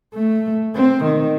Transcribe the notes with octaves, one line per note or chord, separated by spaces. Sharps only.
A3
C4
D#3